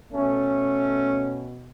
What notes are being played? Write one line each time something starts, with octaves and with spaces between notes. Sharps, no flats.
B2 A3 C#4